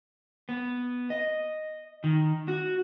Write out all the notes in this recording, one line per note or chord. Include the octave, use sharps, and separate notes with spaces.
B3
D#5
D#3
F#4